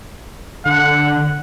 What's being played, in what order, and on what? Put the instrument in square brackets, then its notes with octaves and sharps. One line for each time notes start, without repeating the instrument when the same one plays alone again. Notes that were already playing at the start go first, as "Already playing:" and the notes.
[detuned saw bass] D3 [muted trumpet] F#5